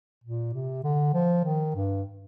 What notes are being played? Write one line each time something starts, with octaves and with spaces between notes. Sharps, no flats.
A#2
C3
D3
F3
D#3
G2